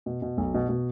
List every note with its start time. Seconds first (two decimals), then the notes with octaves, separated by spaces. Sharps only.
0.06 B2
0.22 B2
0.38 B1
0.54 B2
0.69 B2